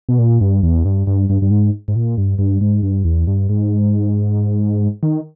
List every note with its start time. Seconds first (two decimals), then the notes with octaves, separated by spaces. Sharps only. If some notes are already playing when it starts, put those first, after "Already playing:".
0.09 B2
0.19 A#2
0.41 G2
0.63 E2
0.85 G2
1.07 G2
1.30 G2
1.42 G2
1.51 G#2
1.88 G#2
1.95 A#2
2.18 G2
2.38 G2
2.61 G#2
2.83 G2
3.05 E2
3.27 G2
3.49 G#2
5.03 D#3